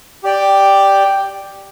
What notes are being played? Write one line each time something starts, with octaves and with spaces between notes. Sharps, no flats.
G4 D5 G5